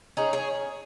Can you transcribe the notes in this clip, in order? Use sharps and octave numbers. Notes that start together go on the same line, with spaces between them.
C#4 D#4 G#4
G#4 C#5